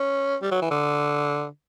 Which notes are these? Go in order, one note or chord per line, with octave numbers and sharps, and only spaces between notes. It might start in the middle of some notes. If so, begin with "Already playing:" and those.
Already playing: C#4
G3
F#3
E3
D3